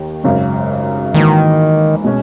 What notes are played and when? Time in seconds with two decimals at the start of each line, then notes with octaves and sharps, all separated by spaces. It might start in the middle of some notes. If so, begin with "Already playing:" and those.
Already playing: D#2 D#3
0.24 G#1 F#2 C#3
1.14 G#2 D#3 E3 A#3 D#4 F#4
2.04 B2 G#3 C#4